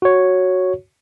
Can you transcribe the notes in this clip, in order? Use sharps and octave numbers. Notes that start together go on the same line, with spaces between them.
F#4 C#5